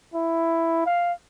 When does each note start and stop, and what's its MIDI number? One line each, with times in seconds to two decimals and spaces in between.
0.14 0.83 64
0.86 1.13 77